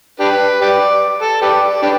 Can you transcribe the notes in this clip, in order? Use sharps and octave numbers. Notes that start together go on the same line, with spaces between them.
D4 G4 B4
G4 B4 D5
A4
G4 B4 D5
D4 G4 B4